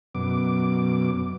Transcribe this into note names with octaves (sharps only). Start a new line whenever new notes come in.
F#2 B2 D6